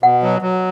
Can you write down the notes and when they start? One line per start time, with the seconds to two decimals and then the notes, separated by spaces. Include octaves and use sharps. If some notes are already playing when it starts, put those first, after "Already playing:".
0.03 B2 F#5
0.23 F#3
0.42 F#3